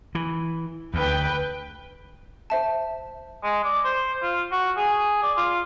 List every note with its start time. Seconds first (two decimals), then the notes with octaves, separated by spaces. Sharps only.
0.15 E3
0.94 D2 B4 G5
2.50 C5 E5 A5
3.43 G#3
3.64 D5
3.84 C5
4.22 F4
4.52 F#4
4.77 G#4
5.23 D5
5.37 F4